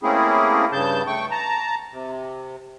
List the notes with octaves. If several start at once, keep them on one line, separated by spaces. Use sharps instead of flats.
A3 A#3 C4 C#4 E4 G#4
G2 C#3 A5 G6
A3 G5 C#6
A5 A#5
C3